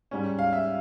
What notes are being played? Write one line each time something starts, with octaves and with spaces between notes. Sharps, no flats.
G#2 G3 C#4
F5
E5